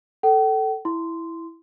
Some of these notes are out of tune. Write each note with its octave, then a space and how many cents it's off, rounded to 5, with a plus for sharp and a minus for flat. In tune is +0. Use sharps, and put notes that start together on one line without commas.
A4 +0 G5 -45
E4 +0 C6 -10